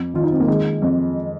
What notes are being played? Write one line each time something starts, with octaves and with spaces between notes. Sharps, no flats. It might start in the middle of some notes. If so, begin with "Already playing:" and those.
Already playing: F2
D#3 F4
D#4
C4
A#3
D#3 G#3
F2